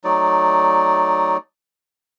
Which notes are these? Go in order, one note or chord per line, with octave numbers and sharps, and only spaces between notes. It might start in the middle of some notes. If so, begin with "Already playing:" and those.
F#3 A3 D#4 D5